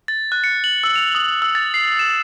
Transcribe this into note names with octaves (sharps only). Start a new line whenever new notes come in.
A6
F#6
C#7
F#7
E6
F7
D#6
E6
A6
C7
E7